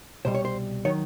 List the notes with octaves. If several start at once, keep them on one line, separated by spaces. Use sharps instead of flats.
C2 B2 G3 C5
C#5
C5
D#3 F#3 C#5